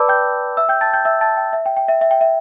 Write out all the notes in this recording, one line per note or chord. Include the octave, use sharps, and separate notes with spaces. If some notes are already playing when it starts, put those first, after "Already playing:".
Already playing: B4 D5 A5 B5 D6 E6
G5 G6
E5 E6
G5 G6
A5 A6
G5 G6
E5 E6
A5 A6
G5
E5
G5
G5
E5
E5
G5
E5